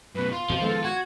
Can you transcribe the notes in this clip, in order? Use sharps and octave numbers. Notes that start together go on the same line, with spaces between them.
F#2 B2 B4
F4 C6
F2 B2 F3
D#3 G#3 B3 A4
F#4 G#6